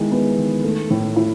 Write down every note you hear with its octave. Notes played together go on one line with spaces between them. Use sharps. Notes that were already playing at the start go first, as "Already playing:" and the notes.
Already playing: D#3 G#3 B3 E4
B3
D#3
A3
A2
E4